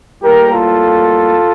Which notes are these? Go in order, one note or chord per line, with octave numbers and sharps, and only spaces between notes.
A2 G3 A#3 G4 A#4
F4 A4